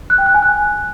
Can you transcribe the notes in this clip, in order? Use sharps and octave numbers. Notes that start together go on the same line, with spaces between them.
F#6
G5
F#6
G#5
F#6